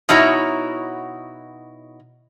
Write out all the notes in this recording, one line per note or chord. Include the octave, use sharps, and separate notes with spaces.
B2 D#4 E4 F#4 C#5 A#5